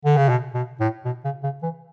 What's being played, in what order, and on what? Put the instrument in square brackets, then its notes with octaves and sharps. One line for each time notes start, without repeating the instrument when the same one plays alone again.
[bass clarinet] D3
C#3
B2
B2
A2
B2
C#3
C#3
E3